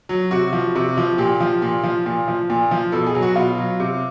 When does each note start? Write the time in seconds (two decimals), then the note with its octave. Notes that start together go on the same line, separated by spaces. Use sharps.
0.09 F#3
0.31 C3 F#4
0.53 F3
0.75 C3
0.97 F3
1.18 A#2 G4
1.40 F3
1.62 A#2
1.83 F3
2.06 A#2
2.28 F3
2.50 A#2
2.71 F3
2.92 B2 A4
3.07 G#4
3.15 F#3
3.22 F#4
3.36 B2 F4
3.58 F#3
3.80 C3